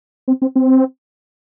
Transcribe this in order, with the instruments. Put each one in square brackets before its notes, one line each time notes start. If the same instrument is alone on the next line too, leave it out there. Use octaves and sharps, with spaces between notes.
[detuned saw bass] C4
C4
C4